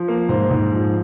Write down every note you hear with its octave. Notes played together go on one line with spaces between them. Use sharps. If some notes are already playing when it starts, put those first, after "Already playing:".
Already playing: F3
A#3
G#2 C5
G#2
F3